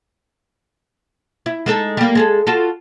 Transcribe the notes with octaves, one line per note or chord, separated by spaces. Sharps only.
E4
G#3 D#4 A4
G3 A#3
G#3 G#4 A4
F4 F#4 A4